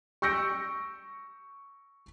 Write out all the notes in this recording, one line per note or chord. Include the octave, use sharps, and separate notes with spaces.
C#6 E6 G6 A#6 C#7 D7